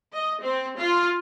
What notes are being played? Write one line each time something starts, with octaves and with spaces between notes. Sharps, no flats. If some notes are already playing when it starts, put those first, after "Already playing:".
D#5
C4
F4